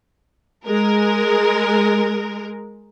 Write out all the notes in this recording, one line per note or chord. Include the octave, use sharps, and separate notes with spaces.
G#3 A#4